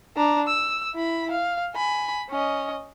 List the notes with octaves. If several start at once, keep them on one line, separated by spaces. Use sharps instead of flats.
D4 A#5
E6
E4 B5
F5
G#5 B5
C#4 D#5